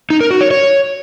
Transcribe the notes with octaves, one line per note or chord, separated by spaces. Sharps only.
D#4
A#4
F#4
C#5
C#5